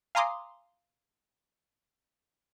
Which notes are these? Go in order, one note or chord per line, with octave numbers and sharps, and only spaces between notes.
F5 G#5 A#5 C6 D6 D#6